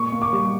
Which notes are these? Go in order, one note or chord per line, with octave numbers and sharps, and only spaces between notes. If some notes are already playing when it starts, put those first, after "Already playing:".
Already playing: A#2 C#6
A#3
D6
G3